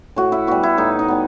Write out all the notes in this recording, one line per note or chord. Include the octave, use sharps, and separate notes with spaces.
A2 F#4
E4
G3 B3 F#4
E4
A2 D#4
D#4
G3 B3